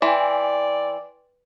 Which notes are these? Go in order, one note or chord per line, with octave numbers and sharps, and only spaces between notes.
E3 D5 G5 G#5 C6